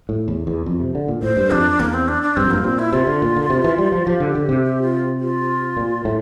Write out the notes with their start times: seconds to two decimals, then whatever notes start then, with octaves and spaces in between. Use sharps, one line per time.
0.09 A2
0.28 E2
0.47 E2
0.66 F2
0.80 C3
0.95 D3
1.08 A#2
1.23 A2 C5
1.37 G2
1.51 F2 D4
1.80 E2 A#3
1.94 C4
2.08 D4
2.22 D4
2.36 G2 C4
2.45 F2
2.51 G2 A#3
2.64 A#2 C4
2.79 E4
2.92 C3 F4
3.07 D3
3.22 A#2
3.36 D3
3.50 C3
3.64 E3
3.78 G3
3.92 F3
4.06 F3 G4
4.20 D3
4.35 D3
4.49 C3
4.63 G4
4.82 F4
5.20 F4
5.77 A#2
6.05 A2